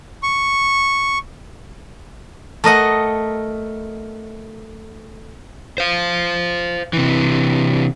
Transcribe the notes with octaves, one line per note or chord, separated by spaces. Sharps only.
C#6
A3 A#4 D#5 F#5
C5 F5
C3 E3